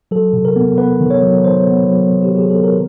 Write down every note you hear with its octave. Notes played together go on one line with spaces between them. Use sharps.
F#3 A4
C3
A#4
B3
B3 B4
D#3
C#5
F#3
D#3 C5
B3
F#3
F#3
G4
F#3 G#4
B3 A4
A#4